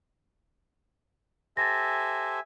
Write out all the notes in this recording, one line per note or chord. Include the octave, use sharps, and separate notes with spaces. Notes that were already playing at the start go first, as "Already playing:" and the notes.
G4 A4 C5 E5 G#5 A6 A#6